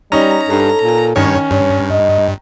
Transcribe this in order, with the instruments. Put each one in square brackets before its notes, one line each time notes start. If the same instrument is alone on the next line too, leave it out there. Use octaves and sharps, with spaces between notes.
[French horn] G3 [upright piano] C#4 D#4 [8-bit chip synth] A#5
[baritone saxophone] G2 [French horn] A4
[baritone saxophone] A#2
[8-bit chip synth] G2 C#5 [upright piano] D#3 [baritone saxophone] C#4
[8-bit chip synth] G2 [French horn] C#5
[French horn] D#5